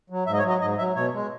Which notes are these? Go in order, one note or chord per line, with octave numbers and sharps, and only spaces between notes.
F#3
G#2 E5
D#5
C#5
F#3
D#5
G#2 D#5
F#3 E5
B2 C#5
G#3